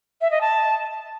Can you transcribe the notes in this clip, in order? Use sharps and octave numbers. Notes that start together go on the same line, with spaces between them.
E5
D#5
A5